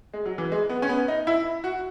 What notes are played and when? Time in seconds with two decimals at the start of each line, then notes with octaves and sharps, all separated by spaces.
0.14 G#3
0.26 F#3
0.38 E3
0.52 G#3
0.69 B3
0.82 C#4
0.89 B3
1.08 D#4
1.27 E4
1.64 F#4